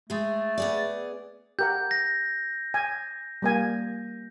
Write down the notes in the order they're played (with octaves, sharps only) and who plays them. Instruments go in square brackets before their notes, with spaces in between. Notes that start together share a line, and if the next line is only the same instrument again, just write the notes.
[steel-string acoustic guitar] G#3 G#4 [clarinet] A3
[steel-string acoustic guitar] B3 G#4 D5
[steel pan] G4 A#4 F#5 [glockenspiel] G6
[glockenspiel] A#6
[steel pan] G#5
G3 A#3 G#5